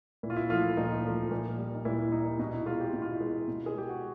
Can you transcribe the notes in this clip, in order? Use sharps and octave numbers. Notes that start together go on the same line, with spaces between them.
A#2 E4
F4
E4
F3 A3 F4
E4
A#2 D#4
F3 A3
A#2
G3
D#4
A#2 E4
E4
G3 D#4
E4
B2 D#4
E4
G#3 F4
G4
B2 E4
F4
E4
G#3
B2
G#4
G#3 G4
F#4